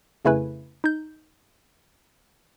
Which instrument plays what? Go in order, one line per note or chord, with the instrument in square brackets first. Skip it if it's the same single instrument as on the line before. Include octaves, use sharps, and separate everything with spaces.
[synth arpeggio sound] F2 C#3 A3 E4 B4 G#5
D#4 G6